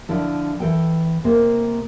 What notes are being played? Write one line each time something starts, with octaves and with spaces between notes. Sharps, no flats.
D3 F3 E4 A4
E3 A4 G5
C3 A#3 C5